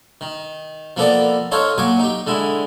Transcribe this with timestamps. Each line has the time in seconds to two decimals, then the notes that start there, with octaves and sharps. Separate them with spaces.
0.21 D#3
0.97 F3 A#3 B3 A4 A#4 D5
1.52 D#4 A4 C5 C#5 F5
1.78 A#2 F#3 G#5 C#6 D6
2.00 D#4 G4
2.27 D3 G#3 E4